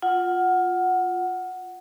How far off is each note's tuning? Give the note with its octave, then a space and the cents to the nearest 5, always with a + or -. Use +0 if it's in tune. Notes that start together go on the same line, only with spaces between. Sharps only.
F4 +10 F#5 +0